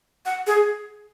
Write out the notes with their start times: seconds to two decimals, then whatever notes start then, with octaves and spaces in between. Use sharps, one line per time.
0.26 F#5
0.47 G#4